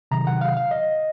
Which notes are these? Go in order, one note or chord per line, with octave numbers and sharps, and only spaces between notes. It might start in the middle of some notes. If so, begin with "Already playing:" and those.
C3 D#3 F#3 A#5
F#5
F5
F5
D#5